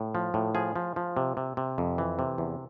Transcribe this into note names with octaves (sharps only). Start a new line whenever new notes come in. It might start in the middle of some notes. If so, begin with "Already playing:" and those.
Already playing: A2
F3
A2
F3 G#4
F3
F3
C3
C3
C3
F2
E3
C3
E2